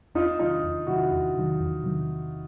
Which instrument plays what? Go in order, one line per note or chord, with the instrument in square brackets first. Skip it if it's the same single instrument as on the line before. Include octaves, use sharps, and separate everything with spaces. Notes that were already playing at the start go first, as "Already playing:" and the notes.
[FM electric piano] E2 [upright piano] D#4 F4
[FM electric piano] C3 D#3 F#3 [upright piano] D#4 F4
[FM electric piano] E2
[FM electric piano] C3 D#3 F#3 [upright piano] E4 F#4
[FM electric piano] E2
C3 D#3 F#3
E2
C3 D#3 F#3